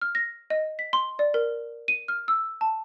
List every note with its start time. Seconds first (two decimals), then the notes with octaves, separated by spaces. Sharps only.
0.01 F6
0.15 A#6
0.50 D#5
0.79 B6
0.93 C6
1.19 D5
1.34 A#4
1.88 D#7
2.08 F6
2.28 E6
2.61 A5